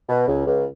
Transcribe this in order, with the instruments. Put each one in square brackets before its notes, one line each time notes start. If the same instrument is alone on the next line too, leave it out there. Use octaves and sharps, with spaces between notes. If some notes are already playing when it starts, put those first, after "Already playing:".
[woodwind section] B2
C#2
C#2